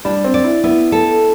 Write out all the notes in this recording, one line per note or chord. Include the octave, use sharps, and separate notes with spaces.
G3 D4
C4
D5
E4
B3 E4
A4